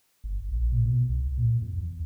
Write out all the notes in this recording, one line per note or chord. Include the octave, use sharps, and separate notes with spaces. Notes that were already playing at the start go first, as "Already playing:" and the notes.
G1
A#1
A#2
B2
C2
A#2
F2
E2